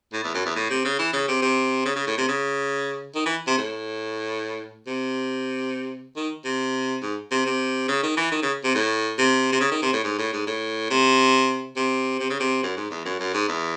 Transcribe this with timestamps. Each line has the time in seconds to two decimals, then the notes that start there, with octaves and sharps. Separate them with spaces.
0.13 A2
0.24 E2
0.34 F#2
0.46 E2
0.56 A2
0.70 C3
0.85 C#3
0.99 E3
1.13 C#3
1.28 C3
1.42 C3
1.85 C#3
1.96 C#3
2.07 A2
2.18 C3
2.29 C#3
3.15 D#3
3.26 E3
3.47 C3
3.58 A2
4.87 C3
6.16 D#3
6.45 C3
7.02 G#2
7.31 C3
7.46 C3
7.89 C#3
8.03 D#3
8.17 E3
8.32 D#3
8.42 C#3
8.64 C3
8.75 A2
9.18 C3
9.52 C3
9.60 C#3
9.71 D#3
9.82 C3
9.93 A2
10.04 G#2
10.18 A2
10.32 G#2
10.47 A2
10.90 C3
11.76 C3
12.20 C3
12.30 C#3
12.40 C3
12.63 F#2
12.77 G#2
12.91 E2
13.05 F#2
13.20 F#2
13.34 G#2
13.48 E2